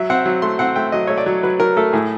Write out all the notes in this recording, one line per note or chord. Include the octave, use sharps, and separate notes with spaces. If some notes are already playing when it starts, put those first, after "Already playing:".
Already playing: F#3 E5
C4 F#5
F#3
A3 C6
C4 F#5
A3 G5
F#3 D#5
A3 C#5
D5
F#3
F#3 B4
F#3 A#4
A3 A4
A2 G#4